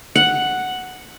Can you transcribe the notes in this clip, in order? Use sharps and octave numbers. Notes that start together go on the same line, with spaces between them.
F#5